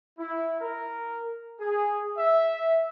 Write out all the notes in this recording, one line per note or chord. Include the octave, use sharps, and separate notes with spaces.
E4
A#4
G#4
E5